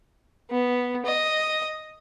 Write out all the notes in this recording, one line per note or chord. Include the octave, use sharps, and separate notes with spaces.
B3
D#5